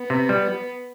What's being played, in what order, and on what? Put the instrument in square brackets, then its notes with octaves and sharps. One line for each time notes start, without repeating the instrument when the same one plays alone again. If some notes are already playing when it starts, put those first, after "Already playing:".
Already playing: [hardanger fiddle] B3
[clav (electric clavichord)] C3
G3